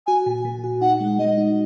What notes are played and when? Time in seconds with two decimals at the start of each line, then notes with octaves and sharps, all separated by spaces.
0.07 F#4 G#5
0.26 A#2
0.45 A#2
0.64 F#4
0.81 D#4 F#5
1.00 G#3
1.19 G#3 D#5
1.38 D#4